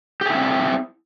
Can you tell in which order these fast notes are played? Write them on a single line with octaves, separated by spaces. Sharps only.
G4 G#4 E4 C4